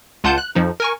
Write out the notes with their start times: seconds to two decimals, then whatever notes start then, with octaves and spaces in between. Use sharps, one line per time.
0.24 C#2 F4 F#5 A5 G6
0.38 F#6
0.55 F2 F3 D#4
0.80 A#4 G#5 C#6